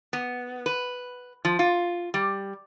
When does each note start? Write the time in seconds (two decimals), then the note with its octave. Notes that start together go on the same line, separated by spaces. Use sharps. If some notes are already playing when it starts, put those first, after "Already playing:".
0.13 B3
0.66 B4
1.45 F3
1.59 F4
2.14 G3